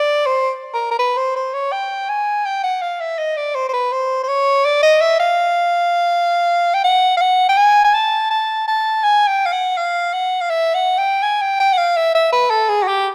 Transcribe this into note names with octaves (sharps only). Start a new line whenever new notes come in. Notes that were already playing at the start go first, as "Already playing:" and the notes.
Already playing: D5
C5
A#4
A#4
B4
C5
C5
C#5
G5
G#5
G5
F#5
F5
E5
D#5
D5
C5
C5
B4
C5
C5
C#5
D5
D#5
E5
F5
G5
F#5
F5
F#5
G5
G#5
G#5
A5
A5
A5
G#5
G5
F5
F#5
F5
F#5
F5
E5
F#5
G5
G#5
G5
G5
F#5
F5
E5
E5
B4
A4
G#4
F#4
G4